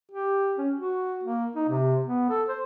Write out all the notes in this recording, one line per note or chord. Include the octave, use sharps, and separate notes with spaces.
G4
C#4
F#4
A#3
D#4
C3
B3
A4
C5